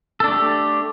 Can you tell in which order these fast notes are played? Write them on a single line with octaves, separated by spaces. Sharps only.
A4 D4 A3 G4